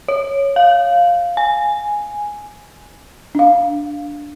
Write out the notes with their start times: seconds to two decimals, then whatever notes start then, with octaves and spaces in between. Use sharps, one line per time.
0.08 C#5
0.56 F5
1.37 G#5
3.35 D4 F5